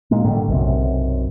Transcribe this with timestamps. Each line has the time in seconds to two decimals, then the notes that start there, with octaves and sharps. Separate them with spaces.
0.11 A#2 G#3 A#3
0.25 A2 D3 G3
0.48 B1 F#2 C3